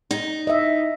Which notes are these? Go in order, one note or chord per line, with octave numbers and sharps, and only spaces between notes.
D#4
D#5 E5